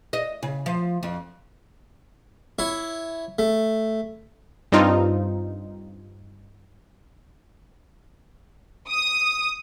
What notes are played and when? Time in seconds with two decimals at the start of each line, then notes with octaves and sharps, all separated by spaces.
0.13 D#5
0.43 C#3
0.66 F3
1.03 F2
2.59 E4 C#5
3.39 A3
4.72 G2 C4 D#4 F4
8.89 D#6